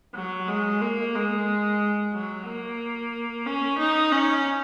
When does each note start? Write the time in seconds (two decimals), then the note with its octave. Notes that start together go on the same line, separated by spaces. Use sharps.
0.15 F#3
0.48 G#3
0.81 A#3
1.15 G#3
2.14 F#3
2.46 A#3
3.46 C#4
3.79 D#4
4.12 C#4